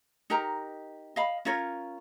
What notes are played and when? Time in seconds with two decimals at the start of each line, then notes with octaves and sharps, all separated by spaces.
0.30 D#4 G4 A#4 A#5
1.16 D#5 F5 B5
1.45 C#4 F4 A#4 C#5